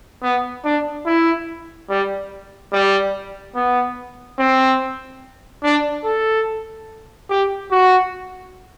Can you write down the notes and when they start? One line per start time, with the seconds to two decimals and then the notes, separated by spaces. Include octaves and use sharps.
0.23 B3
0.64 D4
1.06 E4
1.90 G3
2.72 G3
3.55 B3
4.39 C4
5.64 D4
6.05 A4
7.30 G4
7.71 F#4